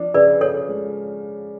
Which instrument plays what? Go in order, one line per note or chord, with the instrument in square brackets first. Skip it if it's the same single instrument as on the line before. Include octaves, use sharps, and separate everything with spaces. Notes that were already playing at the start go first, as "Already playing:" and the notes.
Already playing: [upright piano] F3 D4
[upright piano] C#3 [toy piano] B4 D5
[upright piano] C#3 [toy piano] A4 C#5
[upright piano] G#3